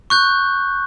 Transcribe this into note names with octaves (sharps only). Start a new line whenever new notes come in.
C#6 F#6 G6